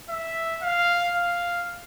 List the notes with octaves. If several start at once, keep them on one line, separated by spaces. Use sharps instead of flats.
E5
F5
F5